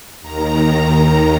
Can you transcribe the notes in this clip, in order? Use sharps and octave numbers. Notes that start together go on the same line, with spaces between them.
D#2 D#3 A#5